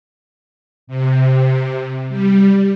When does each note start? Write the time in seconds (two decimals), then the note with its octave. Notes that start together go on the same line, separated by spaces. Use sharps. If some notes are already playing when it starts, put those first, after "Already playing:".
0.87 C3
2.09 G3